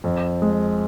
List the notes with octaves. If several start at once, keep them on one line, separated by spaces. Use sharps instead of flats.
F2
G#3